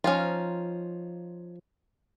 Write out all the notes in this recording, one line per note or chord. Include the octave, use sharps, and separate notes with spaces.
F3 C#4 D#4 F4